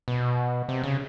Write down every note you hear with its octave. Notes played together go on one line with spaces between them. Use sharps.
B2
C3
C#3